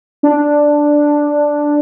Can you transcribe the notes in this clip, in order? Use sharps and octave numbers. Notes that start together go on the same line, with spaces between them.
D4